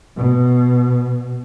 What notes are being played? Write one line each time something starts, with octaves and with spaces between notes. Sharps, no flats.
B2